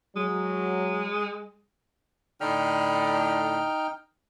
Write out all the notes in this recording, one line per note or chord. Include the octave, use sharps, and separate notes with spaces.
F#3 G#3
A2 D3 D#4 G5 F6